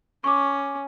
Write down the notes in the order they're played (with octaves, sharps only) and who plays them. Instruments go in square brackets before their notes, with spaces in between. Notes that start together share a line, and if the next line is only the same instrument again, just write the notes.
[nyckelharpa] C#4 [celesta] C#6 D6